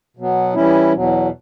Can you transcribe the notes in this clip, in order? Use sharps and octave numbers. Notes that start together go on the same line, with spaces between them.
B2 F#3 B3
E3 G3 C#4 E4
E2 B2 F#3